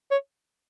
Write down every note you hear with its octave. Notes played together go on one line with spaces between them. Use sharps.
C#5